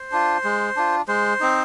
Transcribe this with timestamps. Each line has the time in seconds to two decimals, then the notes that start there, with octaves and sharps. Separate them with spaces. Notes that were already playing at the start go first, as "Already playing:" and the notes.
Already playing: C5
0.12 D4 F4
0.44 G#3
0.76 D4 F4
1.08 G#3 C5
1.40 C4 D#4